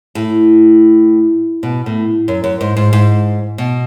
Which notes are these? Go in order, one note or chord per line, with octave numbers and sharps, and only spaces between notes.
A2
B2
A2
F#2
F#2
G#2
G#2
G#2
B2